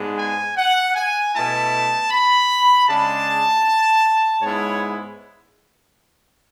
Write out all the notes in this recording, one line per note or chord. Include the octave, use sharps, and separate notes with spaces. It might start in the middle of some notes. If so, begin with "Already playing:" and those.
Already playing: G#2 G#3 B3 D4
G#5
F#5
G#5
B2 A3 E4 A5
B5
C#3 G#3 D4 A5
G#2 G#3 B3 E4 C#5